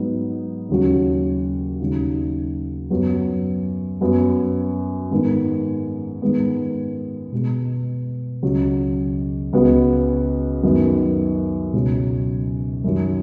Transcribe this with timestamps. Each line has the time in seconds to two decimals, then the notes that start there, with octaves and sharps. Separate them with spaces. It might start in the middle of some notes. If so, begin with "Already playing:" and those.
Already playing: G#2 F#3 B3 D#4
0.69 D#2 C#3 F#3 C#4 F#4
1.80 D#2 C#3 F#3 D#4 F#4
2.90 F#2 F#3 B3
4.01 F#2 F#3 B3 F#4
5.11 G#2 D#3 B3
6.22 G#2 D#3 G#3 B3
7.32 B2 G#3 B3
8.43 C#2 C#3 F#3
9.53 C#2 C#3 B3 F#4
10.63 F#2 D#3 B3 D#4 F#4
11.73 C#2 B2 F#3 C#4
12.84 F#2 D#3 F#3